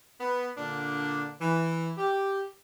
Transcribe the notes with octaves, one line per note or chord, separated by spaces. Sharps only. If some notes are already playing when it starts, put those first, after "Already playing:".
B3
A#2 D3 D4
E3
G4